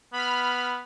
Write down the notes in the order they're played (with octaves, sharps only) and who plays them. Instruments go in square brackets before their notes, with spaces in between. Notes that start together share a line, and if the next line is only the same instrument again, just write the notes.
[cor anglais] B3 [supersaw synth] B5 F6